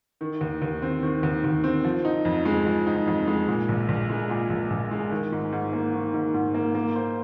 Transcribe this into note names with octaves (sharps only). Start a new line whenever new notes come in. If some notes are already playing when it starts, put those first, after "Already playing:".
D#3
D#2
D#2
C4
D#3
D#2
D#2
C4
F3
D#4
F2
G#3
F3
D#4
F2
G#3
A#2
A#1
A#1
G#3
A#2
A#1
A#1
G#3
D#3
G#2
G#2
A#3
D#3
G#2
G#2
A#3
A#3
C5